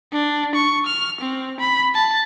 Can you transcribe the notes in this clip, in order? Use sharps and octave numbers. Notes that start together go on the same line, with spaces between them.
D4
C#6
F6
C4
B5
A5